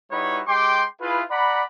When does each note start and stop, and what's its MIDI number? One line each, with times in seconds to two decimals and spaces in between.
0.11 0.41 55
0.11 0.41 63
0.11 0.41 64
0.11 0.41 66
0.11 0.41 71
0.11 0.41 73
0.47 0.83 56
0.47 0.83 67
0.47 0.83 79
0.47 0.83 84
0.47 0.83 86
1.01 1.22 64
1.01 1.22 65
1.01 1.22 68
1.01 1.22 71
1.30 1.64 74
1.30 1.64 78
1.30 1.64 82
1.30 1.64 83